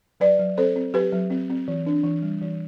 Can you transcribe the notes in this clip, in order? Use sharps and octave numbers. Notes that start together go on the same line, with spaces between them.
F#3 B4 D5
F#3
C4 A4 C5
C4
F#3 G4 B4
F#3
C4
C4
E3
D4
E3
G3
E3